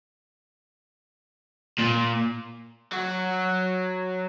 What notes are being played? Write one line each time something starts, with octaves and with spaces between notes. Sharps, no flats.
A#2
F#3 F#4